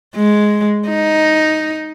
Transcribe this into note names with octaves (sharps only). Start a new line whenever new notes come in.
G#3
D#4